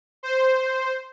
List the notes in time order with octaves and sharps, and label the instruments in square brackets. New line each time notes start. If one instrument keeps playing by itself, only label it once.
[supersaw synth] C5